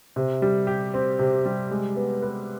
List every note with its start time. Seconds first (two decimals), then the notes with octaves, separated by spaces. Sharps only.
0.16 C3
0.42 G3
0.67 G4
0.94 C4
1.19 C3
1.46 G3
1.71 G#3
1.96 B3
2.22 B4